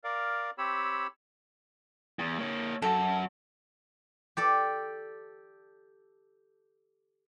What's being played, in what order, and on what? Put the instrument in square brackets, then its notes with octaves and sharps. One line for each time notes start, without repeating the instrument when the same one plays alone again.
[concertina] A#4 D5 F5
C4 G4 C#5 B5 E6
[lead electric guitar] E2
A#3 C#5
[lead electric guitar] F#2 F#4 [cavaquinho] A4
[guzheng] G4 A4 D5